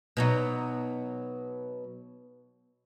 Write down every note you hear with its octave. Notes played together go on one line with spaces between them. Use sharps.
B2 F#3 D#4